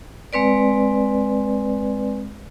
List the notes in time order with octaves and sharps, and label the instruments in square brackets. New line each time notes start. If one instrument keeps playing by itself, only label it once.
[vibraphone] G#3 C4 B4 D5